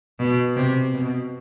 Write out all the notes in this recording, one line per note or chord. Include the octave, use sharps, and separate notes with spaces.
B2
C3
B2